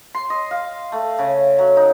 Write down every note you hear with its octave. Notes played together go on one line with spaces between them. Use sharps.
C6
D#5
F5
A3
C#3
F#3
D#4